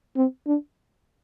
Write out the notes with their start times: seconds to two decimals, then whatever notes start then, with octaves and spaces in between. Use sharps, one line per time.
0.16 C4
0.47 D4